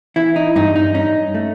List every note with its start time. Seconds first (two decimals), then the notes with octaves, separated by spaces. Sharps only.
0.16 E3 E4
0.36 D#4
0.56 G2 D#4
0.76 D#4
0.94 C#4 D#4
1.34 A3